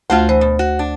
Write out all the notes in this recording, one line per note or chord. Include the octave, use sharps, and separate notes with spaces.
D2 A3 F4 F#4 C5 F6
E3 C5
B2
F#4
D4